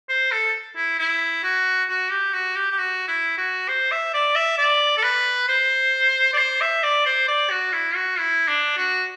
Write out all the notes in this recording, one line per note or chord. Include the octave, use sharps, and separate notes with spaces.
C5
A4
E4
E4
F#4
F#4
G4
F#4
G4
G4
F#4
E4
F#4
C5
E5
D5
E5
D5
A4
B4
C5
D5
C5
E5
D5
C5
D5
F#4
E4
F#4
E4
D4
F#4